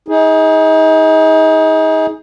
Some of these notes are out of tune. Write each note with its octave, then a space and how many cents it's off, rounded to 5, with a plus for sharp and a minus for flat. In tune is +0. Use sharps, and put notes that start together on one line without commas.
D#4 +35 G#4 +0